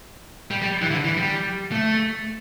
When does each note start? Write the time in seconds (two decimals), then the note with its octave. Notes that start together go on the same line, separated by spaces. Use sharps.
0.51 G3
0.62 G3
0.82 E3
0.91 D3
1.05 E3
1.17 G3
1.72 A3